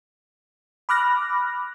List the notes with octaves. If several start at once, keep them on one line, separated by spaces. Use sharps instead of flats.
B5 D6 F6 F#6 A#6